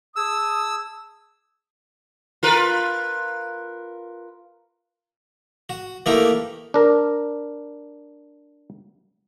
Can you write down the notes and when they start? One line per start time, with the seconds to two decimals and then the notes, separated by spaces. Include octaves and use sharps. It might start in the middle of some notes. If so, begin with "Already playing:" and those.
0.16 G#4 A5 D#6 E6
2.43 F4 A#4 B4
5.69 F#4
6.06 E3 A3 A#3 D#4 G4 A#4
6.74 D4 A#4